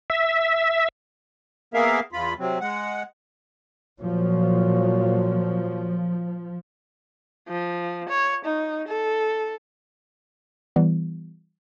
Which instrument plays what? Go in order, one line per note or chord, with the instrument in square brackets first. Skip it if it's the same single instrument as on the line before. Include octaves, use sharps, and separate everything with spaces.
[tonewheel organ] E5
[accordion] A#3 B3 G#4 A#4 E5 F5
E2 F4 B5
C3 F#3 C4
G#3 F#5
[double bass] A#2 F#3 [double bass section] F3
[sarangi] F3
C#5
D#4
A4
[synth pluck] E3 G3 B3